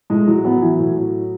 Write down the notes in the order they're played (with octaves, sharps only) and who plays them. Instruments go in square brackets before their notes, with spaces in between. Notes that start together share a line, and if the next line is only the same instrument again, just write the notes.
[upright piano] A2 [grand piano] G#3
[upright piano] A2 [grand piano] F#3
[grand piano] F#3 [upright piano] B3
[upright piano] E3
A2
A2